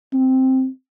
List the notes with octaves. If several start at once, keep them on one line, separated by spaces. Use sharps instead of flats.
C4